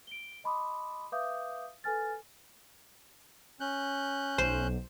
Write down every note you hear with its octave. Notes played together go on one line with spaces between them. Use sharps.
D7 G7
D#5 A5 B5 C6 D6 D#6
B4 E5 F5 D6 D#6 G6
A4 B4 G#5 F6 A6
C#4 F#6 G6
B1 C5